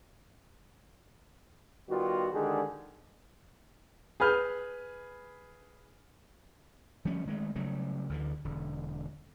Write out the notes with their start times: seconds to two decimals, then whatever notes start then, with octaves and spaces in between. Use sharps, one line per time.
1.90 D#3 G3 B3 F4 F#4
2.33 D3 D#3 G#3 D4 G4 G#4
4.20 G#4 B4 B5 F6 G6
7.05 F3 G3 A3 C#4
7.26 D#3 G#3 A3
7.55 C#3 F#3 G3 A3
8.09 D2 D3 E3
8.45 E1 D3